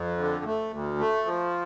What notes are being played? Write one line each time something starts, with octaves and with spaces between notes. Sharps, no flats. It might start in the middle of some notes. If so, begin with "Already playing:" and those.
Already playing: F2
D3
A3
D2
A3
F3